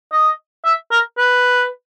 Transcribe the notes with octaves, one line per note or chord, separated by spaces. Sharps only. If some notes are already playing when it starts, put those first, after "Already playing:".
D#5
E5
A#4
B4